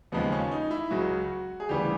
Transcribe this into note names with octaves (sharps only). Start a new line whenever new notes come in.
D#2 C#3 F3 G#3 B3
C#4
D#4
E4
C#2 C#3 F#3 F#4
G#4
D2 C#3 E3 G3 G4